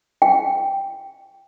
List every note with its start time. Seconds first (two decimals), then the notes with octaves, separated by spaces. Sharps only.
0.22 G5